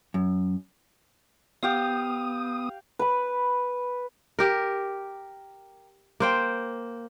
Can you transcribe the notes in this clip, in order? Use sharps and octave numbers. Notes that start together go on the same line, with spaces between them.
F#2
B3 G4 F5 D#6
B4 B5
G4 A#4
A#3 C5 G5